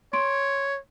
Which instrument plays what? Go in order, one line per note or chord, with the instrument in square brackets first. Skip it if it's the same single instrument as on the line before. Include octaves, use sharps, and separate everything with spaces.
[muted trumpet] C#5 [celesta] C6 D7